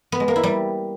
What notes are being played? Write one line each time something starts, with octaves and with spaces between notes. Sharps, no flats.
B3
G#3
A#3
E4
G3